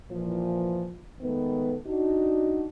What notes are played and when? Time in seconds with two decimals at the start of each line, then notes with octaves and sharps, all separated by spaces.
0.10 A#2 E3 F3
1.21 D#3 G#3 A3 B3
1.85 D4 D#4 F#4